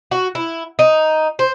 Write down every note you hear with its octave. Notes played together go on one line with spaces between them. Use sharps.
F#4
E4
D#4
C5